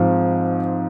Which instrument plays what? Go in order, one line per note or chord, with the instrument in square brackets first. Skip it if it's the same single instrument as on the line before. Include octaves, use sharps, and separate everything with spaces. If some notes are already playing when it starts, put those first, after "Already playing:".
Already playing: [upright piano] G#2 F3 C4